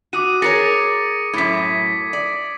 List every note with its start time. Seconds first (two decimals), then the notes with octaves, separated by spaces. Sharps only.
0.13 F#4 D6 D#6 D#7
0.42 G#4 A#4 C#5 A6 A#6 C#7
1.34 F#2 A2 G#6 B6
2.13 D5